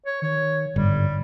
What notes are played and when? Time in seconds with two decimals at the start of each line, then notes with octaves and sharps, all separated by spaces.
0.06 C#5
0.22 D#3 C#5
0.76 G1 G#2 G3